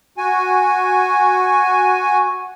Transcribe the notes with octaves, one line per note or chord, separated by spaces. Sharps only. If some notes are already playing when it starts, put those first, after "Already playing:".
F#4 G#5